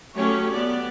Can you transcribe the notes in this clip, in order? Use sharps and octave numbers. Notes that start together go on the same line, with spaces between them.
F#3 A3 C#4 G4 C#5
B3 D5